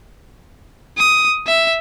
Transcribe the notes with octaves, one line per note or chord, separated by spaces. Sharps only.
D#6
E5